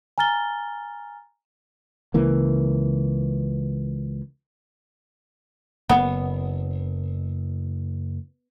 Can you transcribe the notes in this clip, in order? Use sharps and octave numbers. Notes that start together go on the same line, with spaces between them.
G#5 A#5 F6 A6 G7
C#2 C#3 E3 A#3
F#1 B3